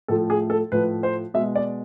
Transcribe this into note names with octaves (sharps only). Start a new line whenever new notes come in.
A2 F3 A3 A4
G#4
A4
A2 F3 A3 B4
C5
B2 G#3 E5
D5